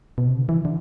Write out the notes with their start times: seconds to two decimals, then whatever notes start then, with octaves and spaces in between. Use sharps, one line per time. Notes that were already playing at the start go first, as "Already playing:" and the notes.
0.18 B2
0.28 C3
0.38 D3
0.49 E3
0.65 D3